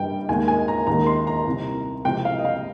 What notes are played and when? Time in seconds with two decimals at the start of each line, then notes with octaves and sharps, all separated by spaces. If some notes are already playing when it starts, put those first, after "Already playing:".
Already playing: G2 G3 G5
0.29 D#2 D#3 G#3 G#5
0.48 G#5
0.68 A#5
0.87 D#2 D#3 G#3 A#5
1.06 C6
1.27 A#5
1.47 C2 C3 G3
2.04 C2 C3 F3 G#3 G5
2.25 F5
2.39 D#5
2.45 F5